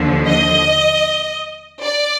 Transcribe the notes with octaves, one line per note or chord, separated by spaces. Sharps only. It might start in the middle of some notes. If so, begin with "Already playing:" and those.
Already playing: D#2 D3 F3
D#5
D5